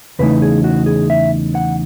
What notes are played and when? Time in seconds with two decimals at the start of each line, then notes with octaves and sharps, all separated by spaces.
0.19 E2 C#3 E3 A3 D#4 B4
0.42 G#4
0.64 F#4
0.86 G#4
1.10 E5
1.55 F#5